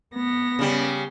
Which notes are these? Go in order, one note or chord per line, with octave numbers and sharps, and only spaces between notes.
B3 A#6
C#3 G3